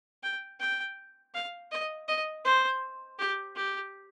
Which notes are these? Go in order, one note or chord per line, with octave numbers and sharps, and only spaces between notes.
G5
G5
F5
D#5
D#5
C5
G4
G4